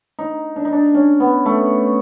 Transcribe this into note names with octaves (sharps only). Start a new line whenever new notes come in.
D#4
D4
D#4
D4
C#4
B3
A3